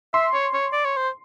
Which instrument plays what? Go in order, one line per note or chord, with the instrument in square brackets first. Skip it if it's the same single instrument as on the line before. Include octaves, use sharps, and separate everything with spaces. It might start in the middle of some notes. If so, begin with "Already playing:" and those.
[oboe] E5 [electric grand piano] C6
[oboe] C#5
C#5
D5
C#5
C5